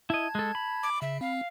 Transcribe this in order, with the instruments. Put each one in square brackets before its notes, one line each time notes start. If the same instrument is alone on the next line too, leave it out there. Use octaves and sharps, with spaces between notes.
[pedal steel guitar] E4 D#5 [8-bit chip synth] A5 G#6
[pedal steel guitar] G#3 A4
B5
[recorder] D6
[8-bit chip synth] C#3 [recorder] E5
[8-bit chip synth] C4 [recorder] F5